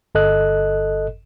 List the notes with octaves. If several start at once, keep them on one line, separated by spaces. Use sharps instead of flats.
G1 A4 D#5 F#6